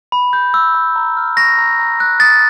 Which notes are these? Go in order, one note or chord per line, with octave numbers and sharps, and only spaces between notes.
B5
G6
E6
B5
A#5
F6
C#6 A#6
A#5
A#5
F#6
D#6 A6